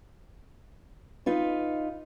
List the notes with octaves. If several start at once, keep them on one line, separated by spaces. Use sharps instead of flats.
D#4 F4 B4